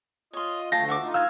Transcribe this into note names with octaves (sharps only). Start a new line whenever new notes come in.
F4 C#5 D#5 C6
D2 A3 F4 G5 A5 A#6 C7
F#4 E5 D6
D#4 F4
F5 E6 F6 G#6